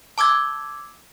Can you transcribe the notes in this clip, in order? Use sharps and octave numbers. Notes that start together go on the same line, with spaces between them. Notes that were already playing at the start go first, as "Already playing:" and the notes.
A5 D6 E6 G#6